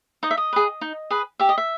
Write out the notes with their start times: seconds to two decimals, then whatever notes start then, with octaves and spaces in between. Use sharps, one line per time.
0.23 D#4 D#5
0.31 E5
0.37 D#5
0.53 G#4 B4
0.81 D#4
1.10 G#4 B4
1.39 G4 E5
1.49 D#5
1.58 E5